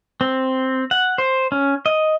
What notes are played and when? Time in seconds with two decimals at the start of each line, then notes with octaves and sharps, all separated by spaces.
0.21 C4
0.91 F#5
1.18 C5
1.52 C#4
1.86 D#5